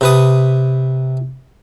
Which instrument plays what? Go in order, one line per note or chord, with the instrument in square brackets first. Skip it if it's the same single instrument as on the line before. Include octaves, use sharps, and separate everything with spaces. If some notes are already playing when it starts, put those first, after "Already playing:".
[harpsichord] C3 B4 D#6